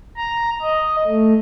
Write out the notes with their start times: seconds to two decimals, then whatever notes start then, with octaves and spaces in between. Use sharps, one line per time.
0.16 A#5
0.62 D#5
1.06 A3